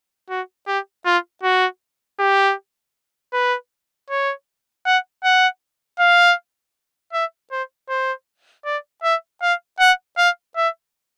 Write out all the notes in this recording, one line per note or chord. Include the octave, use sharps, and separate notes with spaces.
F#4
G4
F4
F#4
G4
B4
C#5
F#5
F#5
F5
E5
C5
C5
D5
E5
F5
F#5
F5
E5